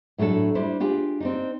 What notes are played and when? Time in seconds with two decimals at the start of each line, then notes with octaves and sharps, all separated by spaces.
0.18 A2 F#3 A3 D4 A4
0.55 G3 D4 E4 C5
0.80 D4 F4 G4 G#4
1.21 C4 D4 D#4